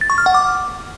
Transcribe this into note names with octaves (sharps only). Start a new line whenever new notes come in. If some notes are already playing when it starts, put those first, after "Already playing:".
A6
C#6
F6
F#5
D6